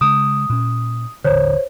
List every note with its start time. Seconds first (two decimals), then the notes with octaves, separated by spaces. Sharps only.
0.01 C#3 G#3 D#6
0.49 A#2 C#4
1.24 D#1 A1 D3 C5 C#5